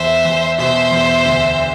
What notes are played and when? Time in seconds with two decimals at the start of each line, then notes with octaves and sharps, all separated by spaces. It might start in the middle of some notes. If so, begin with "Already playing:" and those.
Already playing: E2 C5 E5
0.25 E2
0.58 B2 C5 E5
0.92 E2
1.25 D2